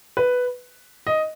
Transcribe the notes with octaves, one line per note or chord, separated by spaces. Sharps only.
B4
D#5